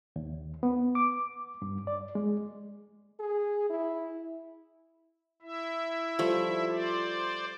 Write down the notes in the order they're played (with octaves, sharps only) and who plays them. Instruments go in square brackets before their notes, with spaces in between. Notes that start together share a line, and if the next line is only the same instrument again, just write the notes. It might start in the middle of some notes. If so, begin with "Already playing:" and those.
[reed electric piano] D#2
B3
D6
G2
D5
G#3
[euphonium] G#4
E4
[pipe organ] E4 E5
[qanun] F3 G3 A3
[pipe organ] C5 D5